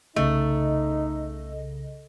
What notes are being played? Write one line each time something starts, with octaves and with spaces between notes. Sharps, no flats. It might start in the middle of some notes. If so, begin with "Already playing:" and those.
C2 C#3 A3 D#4 D#5